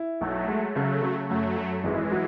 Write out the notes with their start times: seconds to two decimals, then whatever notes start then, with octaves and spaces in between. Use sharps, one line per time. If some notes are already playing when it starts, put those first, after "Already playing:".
Already playing: E4
0.21 B1 F#3 A3
0.48 G#3
0.75 C#3 F#3 A3
1.02 C#3
1.29 F#2 F#3 A3
1.56 F#2
1.84 G#1 E3 G#3
2.11 F#3